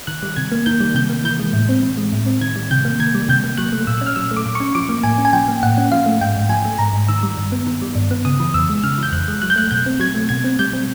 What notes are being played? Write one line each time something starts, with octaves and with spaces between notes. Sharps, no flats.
D#3 F#6
G3
C3 G#6
A#3
D#3 G6
G3
C3 G6
A#3
E3 G6
G#3
A2
C4
E3
G#3
A2
C4
D#3 G#6
G3
C3 G6
A#3
D#3 G#6
G3
C3 G6
A#3
F#3 F#6
A3
A#2 E6
C#4
F6
F#3 E6
A3
D6
A#2
C#6
C#4
F3 D6
A#3
A2 G#5
C#4
G#5
F3 G5
A#3
A2 F#5
C#4
F3 F5
A3
G#2 G5
G#2
F3 G#5
A3
G#2 A#5
G#2
D#3 E6
G3
G2
B3
D#3
G3
G2
B3
C#3 D#6
E3
F2 E6
G#3
C#3 F6
E3 G6
F2 F#6
G#3
F#3 F#6
G6
A3 F#6
B2 G6
C4
F#3 G#6
A3
B2 G#6
C4
G3 G6
C4